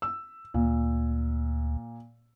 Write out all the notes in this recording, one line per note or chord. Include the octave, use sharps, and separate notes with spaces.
E6
D2 A#2